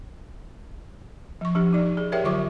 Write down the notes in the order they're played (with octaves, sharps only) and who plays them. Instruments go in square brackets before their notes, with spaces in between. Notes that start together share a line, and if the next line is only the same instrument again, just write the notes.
[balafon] F3 C#6
F3 D4 G4
D#4 D5
G#4
G4 A#4 C#5 E5 G5
D3 F#3 F4 C#6 D6